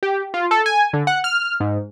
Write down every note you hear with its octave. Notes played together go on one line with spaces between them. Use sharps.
G4
F4
A4
G#5
D3
F#5
F6
G#2